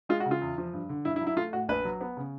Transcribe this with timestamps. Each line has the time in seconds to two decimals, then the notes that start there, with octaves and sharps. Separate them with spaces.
0.09 G#3 F4
0.20 F#4
0.26 C#3
0.31 F4
0.42 E2
0.58 F3
0.73 G2
0.89 D3
1.05 G2 E4
1.16 E4
1.21 F#3
1.27 E4
1.37 A3 F4
1.53 A2 F#4
1.68 A#1 B4
1.85 F#3
2.01 B3
2.17 C#3